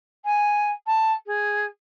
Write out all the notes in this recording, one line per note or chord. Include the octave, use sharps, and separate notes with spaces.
G#5
A5
G#4